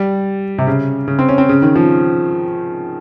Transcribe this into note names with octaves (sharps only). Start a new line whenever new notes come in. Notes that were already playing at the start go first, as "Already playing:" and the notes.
Already playing: G3
C3
C#3
C#3
C4
C#4
C4
C#3
D#3
F3